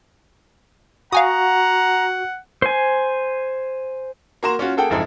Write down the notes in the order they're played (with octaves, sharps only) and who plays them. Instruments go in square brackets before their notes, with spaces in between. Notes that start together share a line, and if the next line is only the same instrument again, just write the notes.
[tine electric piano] F#4 [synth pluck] F5 G#5 D#6 [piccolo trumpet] F#5 [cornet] A#5
[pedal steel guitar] C5 G#5
[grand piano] A#3 F#4 A#5 C6 E7
C#4 F4 F#4
A#3 G#4 A4 F#5 G5
F#1 F2 G#2 E4 G#4 A4